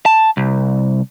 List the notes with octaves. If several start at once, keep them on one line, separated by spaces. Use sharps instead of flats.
A5
C2